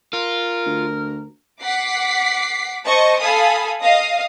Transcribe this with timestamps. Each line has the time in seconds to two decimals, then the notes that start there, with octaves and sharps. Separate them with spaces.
0.13 F4 A#4
0.66 D2
1.63 F#5 D6 B6 C7
2.86 C5 D#5 A5 C#6
3.20 A4 F5 G#5 B5 D#6
3.82 D#5 F5 D#6